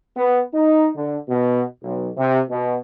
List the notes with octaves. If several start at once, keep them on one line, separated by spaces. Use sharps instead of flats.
B3
D#4
D3
B2
B1
C3
B2